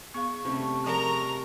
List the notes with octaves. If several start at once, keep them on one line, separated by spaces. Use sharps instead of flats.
B3 G#4 F5 C#6
C3 G3 A3 C4 C#4
F3 G#4 A#4 A#5